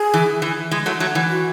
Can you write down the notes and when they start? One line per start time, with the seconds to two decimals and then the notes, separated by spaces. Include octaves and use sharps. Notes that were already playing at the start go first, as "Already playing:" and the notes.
Already playing: G#4
0.14 E3
0.42 E3
0.71 E3 G#3
0.86 F#3 A3
1.00 F#3 A3
1.15 E3
1.30 F#4